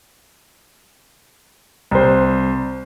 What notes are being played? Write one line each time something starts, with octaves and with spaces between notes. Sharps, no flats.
C2 C5